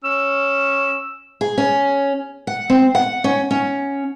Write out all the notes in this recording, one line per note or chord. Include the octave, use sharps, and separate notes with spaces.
C#4 E6
G#4
C#4
F#5
C4
F#5
C#4
C#4